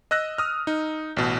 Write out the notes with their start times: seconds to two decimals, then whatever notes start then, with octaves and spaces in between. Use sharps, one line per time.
0.11 D#5 E6 F#6 A#6
0.38 D#6 F6
0.67 D#4
1.17 A1 B2